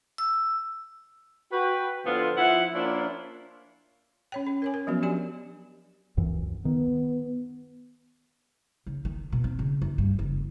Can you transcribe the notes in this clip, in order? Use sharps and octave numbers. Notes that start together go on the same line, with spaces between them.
E6
F#4 B4 G5
A2 D3 F3 B3 F4
F3 E4 F#5
F3 A#3 C#4 D4 E4 F4
C#4 C#5 G5
C#4
A#4 C#5 G#5
A#4
F3 F#3 B3 C#4 F#4
D4 G4 D5 G#5
C#2 F#2 E3
D#3 B3
C#3
D#3
B2
C4
C#3
F#2
G2
F#1